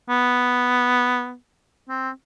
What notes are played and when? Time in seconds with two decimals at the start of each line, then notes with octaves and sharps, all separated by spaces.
0.10 B3
1.89 C4